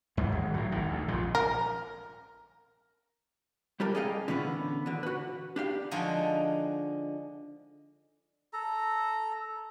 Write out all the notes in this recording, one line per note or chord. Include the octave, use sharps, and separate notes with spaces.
D#2 G#2 E3 G#3
G#1
A2 F#3
G#1 A2 D#3
D2
A#1 G#2 C#3 F3
A#4
G3 G4 A4 A#4
G#4 A4 D#5 F5 G5
D3 E3 B3 C#4
D#2 D3
F#4 B4
D4 G4 F5
D3 F3 G#3 D#4 F4 F#4
A4 A#5